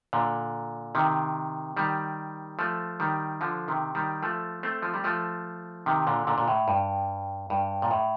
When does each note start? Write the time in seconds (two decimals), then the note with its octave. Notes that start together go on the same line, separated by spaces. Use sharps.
0.13 A#2 D3
0.95 C3 D#3
1.77 D#3 G3
2.59 F3 A3
3.00 D#3 G3
3.41 D3 F3
3.68 C3 D#3
3.95 D#3 G3
4.22 F3 A3
4.63 A3 C4
4.82 F3
4.94 G3
5.04 F3 A3
5.86 C3 D#3
6.07 A#2 D3
6.27 A#2 D3
6.38 A#2
6.48 A2
6.68 G2
7.50 G2
7.82 A#2
7.91 A2